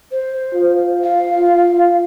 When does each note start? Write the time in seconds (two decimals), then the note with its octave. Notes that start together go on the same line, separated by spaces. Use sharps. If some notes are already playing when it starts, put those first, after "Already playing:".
0.12 C5
0.55 F4
1.03 F5